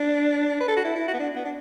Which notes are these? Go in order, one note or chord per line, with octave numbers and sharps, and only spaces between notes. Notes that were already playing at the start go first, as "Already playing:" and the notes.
Already playing: D4
B4
A4
F#4
E4
E4
F#4
B3
D4
B3
D4